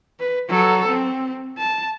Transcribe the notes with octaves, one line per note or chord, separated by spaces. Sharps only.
B4
F#3 A4
C4
A5